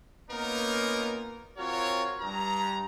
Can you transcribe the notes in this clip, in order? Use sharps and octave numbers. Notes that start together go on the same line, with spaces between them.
A#3 B3 C#4 D#4 F4 A#4
C4 F4 F#4 A#4 C#5
G2 A#5